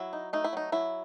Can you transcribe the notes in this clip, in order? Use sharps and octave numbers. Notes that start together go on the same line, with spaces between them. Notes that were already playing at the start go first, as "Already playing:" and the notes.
Already playing: F#3 E4
D#4
A3 D#4
E4
F#3 D#4
F#3 E4